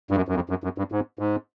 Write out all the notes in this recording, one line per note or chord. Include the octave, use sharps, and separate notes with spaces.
G2
F#2
F#2
F2
F#2
F#2
G2
G#2
G#2